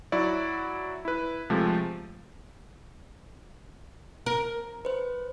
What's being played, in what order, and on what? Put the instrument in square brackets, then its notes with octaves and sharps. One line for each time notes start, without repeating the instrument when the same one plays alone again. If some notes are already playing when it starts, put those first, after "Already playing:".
[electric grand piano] F#3 E4 F#4 D5
E4 B4
C3 F3 G#3 A3
[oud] A#4
[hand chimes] B4 C5